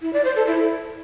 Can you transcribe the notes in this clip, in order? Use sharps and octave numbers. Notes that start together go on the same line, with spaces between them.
E4
D5
C5
A4
E4